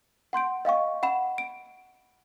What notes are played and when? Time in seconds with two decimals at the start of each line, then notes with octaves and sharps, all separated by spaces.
0.33 F#5 C6 G6 D7
0.65 D#5 F5 G5 C#6
1.03 F#5 B5 E7
1.38 D7